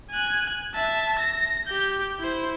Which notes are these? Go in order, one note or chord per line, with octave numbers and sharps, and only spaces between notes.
G#5 F#6
E5 A5
A#6
G4 G6
E4 C5